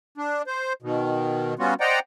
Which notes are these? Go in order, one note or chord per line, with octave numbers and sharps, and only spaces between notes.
D4
C5
B2 D#3
G3 B3 C#4 F4 F#4
C5 D5 D#5 F#5 G5 A#5